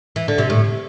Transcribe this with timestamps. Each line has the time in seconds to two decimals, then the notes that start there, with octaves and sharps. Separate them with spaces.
0.16 E3
0.28 D3
0.38 C3
0.50 A2